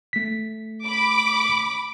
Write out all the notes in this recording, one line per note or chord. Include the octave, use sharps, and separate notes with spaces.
A3 B6
B5 D6